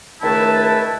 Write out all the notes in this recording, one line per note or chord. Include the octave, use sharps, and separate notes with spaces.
C#2 D#3 A3 E4 B4 A5